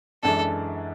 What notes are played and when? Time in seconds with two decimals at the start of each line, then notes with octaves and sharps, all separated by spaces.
0.23 F#2 E3 G#3 D4 A4